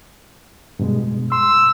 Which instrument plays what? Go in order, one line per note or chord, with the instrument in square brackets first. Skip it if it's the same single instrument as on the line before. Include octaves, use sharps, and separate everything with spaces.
[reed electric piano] G2 B2 G#3
[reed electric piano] C6 [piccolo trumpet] E6